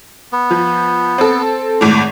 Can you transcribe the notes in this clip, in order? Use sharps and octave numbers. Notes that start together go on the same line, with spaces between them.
B3
F3
C4 A4
G#1 A2 D6